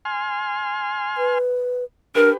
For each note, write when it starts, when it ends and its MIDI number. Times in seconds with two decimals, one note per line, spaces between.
0.05 1.38 80
0.05 1.38 84
0.05 1.38 89
1.18 1.84 71
2.15 2.31 62
2.15 2.37 67
2.15 2.30 70
2.15 2.37 71